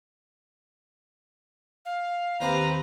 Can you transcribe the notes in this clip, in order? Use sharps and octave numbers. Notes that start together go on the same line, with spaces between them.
F5
D#2 C4 G4 B4 C5 G5 A#5